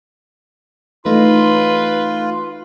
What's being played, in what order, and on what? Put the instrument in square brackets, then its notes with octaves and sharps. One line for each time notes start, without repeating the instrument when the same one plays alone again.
[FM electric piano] E3 A3 D#4 [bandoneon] F4 [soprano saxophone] B4 [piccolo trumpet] C6